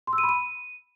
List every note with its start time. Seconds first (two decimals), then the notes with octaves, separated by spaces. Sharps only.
0.07 C6
0.13 E6
0.18 D#7
0.23 B5
0.29 D#7